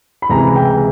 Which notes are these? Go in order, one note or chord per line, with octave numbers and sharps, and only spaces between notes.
B5
C#2 C3 E3 G#3 A#5
G5